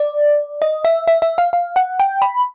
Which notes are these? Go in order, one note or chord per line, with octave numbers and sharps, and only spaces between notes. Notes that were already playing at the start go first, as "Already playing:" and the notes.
Already playing: D5
D#5
E5
E5
E5
F5
F5
F#5
G5
B5